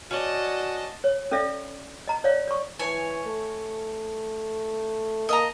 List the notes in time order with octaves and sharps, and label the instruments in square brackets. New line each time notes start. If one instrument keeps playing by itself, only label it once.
[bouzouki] C#4 D5 [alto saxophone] F#4 [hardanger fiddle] D#5 A5
[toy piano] C#5
C#4 A4 D5 E5 F5
D#5 A#5
C#5 D5 F5
D5 C#6
[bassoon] E3 [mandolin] C#5 G#5
[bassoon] A3
[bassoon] A#3 [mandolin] D#5 E5 A#5